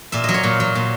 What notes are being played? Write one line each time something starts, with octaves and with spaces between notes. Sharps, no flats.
A#2 E5
F#3 D#5
C#5
A#2
F#3
A#2